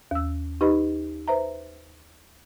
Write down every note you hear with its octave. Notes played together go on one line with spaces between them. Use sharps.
D#2 E6
D#4 G4 B4 D#5 B5
B4 C5 E5 A#5